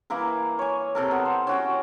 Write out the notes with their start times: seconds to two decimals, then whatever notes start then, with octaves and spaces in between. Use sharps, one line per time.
0.10 E3 A#3 E4 A#4
0.59 C#5 G#5
0.95 C3 A4 A#4
1.11 B3
1.25 C5
1.47 C#4 F#4 G5